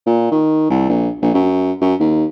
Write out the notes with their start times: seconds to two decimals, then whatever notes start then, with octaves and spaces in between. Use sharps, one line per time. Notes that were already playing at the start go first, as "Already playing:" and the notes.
0.07 A#2
0.32 D#3
0.70 C2
0.89 A#1
1.22 A#1
1.34 F#2
1.82 F#2
2.00 D#2